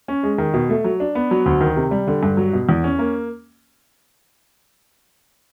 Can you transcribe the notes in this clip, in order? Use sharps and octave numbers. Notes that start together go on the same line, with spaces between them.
C#4
G#3
D#3
B2
A3
F#3
D4
B3
F#3
D2
D#3
C3
G3
D3
G2
F#3
B2
E2
C#4
A#3